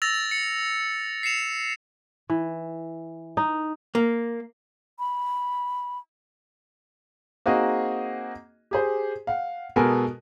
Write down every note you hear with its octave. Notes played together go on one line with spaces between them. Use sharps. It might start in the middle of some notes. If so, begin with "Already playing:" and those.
E6 A6 A#6 F7
C#7
C7 C#7 E7 F7
E3
D#4
A#3
B5
A#3 C4 D#4 F#4 G#4 D#5
G4 G#4 C5
F5 F#5
B2 G#3 B3 A4 A#4 G#5